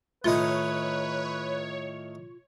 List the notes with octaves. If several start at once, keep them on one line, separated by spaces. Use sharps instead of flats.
A2 D#3 D#4 F4 B4 C#5